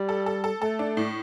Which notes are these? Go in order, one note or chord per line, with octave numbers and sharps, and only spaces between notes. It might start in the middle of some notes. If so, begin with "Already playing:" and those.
Already playing: G3
A4
A4
A4
A3 A4
D4
A2